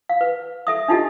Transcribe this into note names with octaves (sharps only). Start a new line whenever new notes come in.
F5
B4
A4 E5 D#6
D4 D#4 F4 G4 A4 D#5